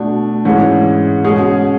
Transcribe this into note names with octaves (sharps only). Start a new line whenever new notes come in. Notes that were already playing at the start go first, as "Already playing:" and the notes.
Already playing: B2 A3 D4
G#2 E3 G#3 C#4
B2 G#3 C#4 G#4